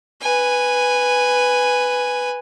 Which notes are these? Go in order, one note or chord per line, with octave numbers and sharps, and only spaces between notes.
B4 G#5